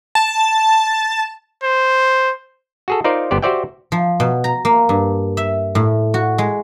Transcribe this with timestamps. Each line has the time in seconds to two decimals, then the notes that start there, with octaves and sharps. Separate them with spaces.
0.15 A5
1.64 C5
2.88 F#4 G#4 A4
3.04 D#4 F4 A#4 C5 D5
3.31 G1 B3 G4 C5 D5
3.42 F#4 G4 C5 D5 E5 G5
3.92 F3
4.20 B2
4.44 A#5
4.65 A#3
4.89 G2
5.37 E5
5.75 A2
6.14 F#4
6.38 G#3